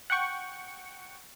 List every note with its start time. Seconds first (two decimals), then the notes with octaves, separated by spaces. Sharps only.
0.10 F#5 G5 C#6 C#7